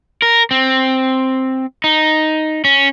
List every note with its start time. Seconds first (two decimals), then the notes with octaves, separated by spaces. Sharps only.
0.22 A#4
0.51 C4
1.84 D#4
2.65 C#4